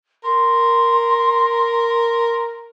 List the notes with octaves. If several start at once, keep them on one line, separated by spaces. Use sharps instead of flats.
A#4 C6